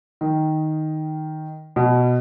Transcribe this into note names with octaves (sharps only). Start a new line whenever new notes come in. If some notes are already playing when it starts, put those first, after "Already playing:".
D#3
B2